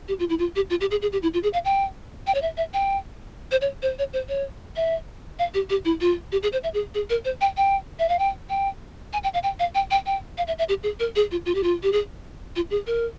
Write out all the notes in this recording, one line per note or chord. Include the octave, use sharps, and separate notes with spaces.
G4
F4
E4
F4
G4
F4
G4
G#4
G#4
G4
E4
F4
G#4
F5
G5
G5
C#5
E5
E5
G5
C5
C#5
C5
C#5
C5
C#5
E5
F5
G4
G4
E4
F4
G4
G#4
C5
E5
G#4
G#4
A#4
C5
G5
G5
E5
F5
G5
G5
G#5
G5
F5
G5
F5
G5
G5
G5
F5
E5
E5
G4
G#4
A#4
G#4
F4
F4
G4
F4
G4
G#4
F4
G#4
A#4